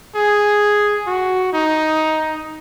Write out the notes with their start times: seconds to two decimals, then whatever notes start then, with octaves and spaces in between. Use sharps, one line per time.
0.15 G#4
1.07 F#4
1.53 D#4